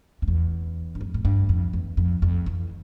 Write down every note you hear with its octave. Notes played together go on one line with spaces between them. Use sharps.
F2
E2
G2
F2
A2
G2
F2
E2
F2
F2
E3